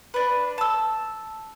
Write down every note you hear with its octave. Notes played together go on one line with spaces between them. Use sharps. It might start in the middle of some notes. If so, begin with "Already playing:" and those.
D4 B4
A5 E6